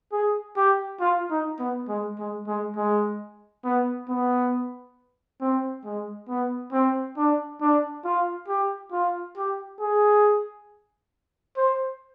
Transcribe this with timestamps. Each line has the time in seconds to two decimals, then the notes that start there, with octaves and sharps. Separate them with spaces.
0.12 G#4
0.57 G4
1.01 F4
1.30 D#4
1.59 B3
1.88 G#3
2.19 G#3
2.47 G#3
2.76 G#3
3.64 B3
4.09 B3
5.41 C4
5.84 G#3
6.29 B3
6.72 C4
7.17 D4
7.61 D4
8.05 F4
8.48 G4
8.92 F4
9.37 G4
9.80 G#4
11.57 C5